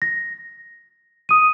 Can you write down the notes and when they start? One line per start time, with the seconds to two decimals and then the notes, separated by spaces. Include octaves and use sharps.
0.02 A#6
1.29 D#6 D#7